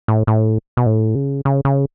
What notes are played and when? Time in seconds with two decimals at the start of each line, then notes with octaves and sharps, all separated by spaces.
0.08 A2
0.27 A2
0.77 B2
0.86 A2
1.15 C#3
1.45 C#3
1.65 C#3